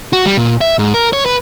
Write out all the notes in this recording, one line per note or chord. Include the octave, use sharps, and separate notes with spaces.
F#4
G3
A#2
E5
G#2
A#4
C#5
B4